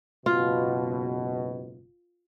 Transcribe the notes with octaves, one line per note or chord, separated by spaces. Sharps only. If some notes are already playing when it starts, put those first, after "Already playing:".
F#1 G#2 B2 F4